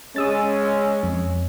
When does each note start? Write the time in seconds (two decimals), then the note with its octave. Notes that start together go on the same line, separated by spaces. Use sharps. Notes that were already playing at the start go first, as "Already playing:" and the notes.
0.16 G#3 C#4 D#6 E6 A6
0.65 E6
1.03 F2